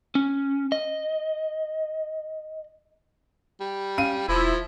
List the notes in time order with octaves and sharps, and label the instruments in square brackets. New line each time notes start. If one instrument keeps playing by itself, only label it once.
[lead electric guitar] C#4
D#5
[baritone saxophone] G3
[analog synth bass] C#4 [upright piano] F5 D#7
[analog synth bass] E1 [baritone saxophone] F3 [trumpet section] E4